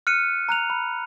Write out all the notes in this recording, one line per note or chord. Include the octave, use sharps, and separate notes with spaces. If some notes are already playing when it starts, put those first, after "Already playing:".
F6 F#6 C#7 D#7
A#5 F#6 F7
B5